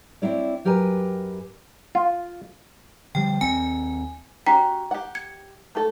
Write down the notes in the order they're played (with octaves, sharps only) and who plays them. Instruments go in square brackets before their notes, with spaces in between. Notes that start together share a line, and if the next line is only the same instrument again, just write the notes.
[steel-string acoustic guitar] C4 D4 E4 C#5 D5
F#2 G4 A#4 B4 G#5
[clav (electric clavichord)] F4
[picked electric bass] D3 F3 G3 [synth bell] G5
[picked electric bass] D#2 C4 [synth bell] G#5
[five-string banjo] C#4 F#4 G4 [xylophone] G5 A#5 B6
[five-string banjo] G4 F#5
[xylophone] G#6 C#7
[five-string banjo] A3 G4 A4